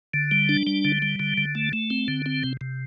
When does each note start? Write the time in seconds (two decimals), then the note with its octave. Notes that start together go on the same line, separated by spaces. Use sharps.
0.14 D3
0.31 G3
0.49 D4
0.67 G3
0.85 D3
1.02 G3
1.20 D3
1.38 D3
1.55 A3
1.73 A3
1.90 C4
2.08 D3
2.26 C4
2.44 C3
2.61 C3